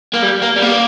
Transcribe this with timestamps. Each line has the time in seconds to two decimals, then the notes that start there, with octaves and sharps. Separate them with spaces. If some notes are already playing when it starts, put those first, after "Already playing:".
0.14 A#3
0.23 G3
0.42 A#3
0.56 G3
0.62 A#3